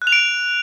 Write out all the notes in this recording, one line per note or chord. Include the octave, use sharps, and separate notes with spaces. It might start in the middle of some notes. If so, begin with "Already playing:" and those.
F#6
F7
D7